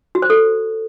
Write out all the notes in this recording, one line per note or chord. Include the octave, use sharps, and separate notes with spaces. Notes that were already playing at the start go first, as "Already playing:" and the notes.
F#4
C5
A4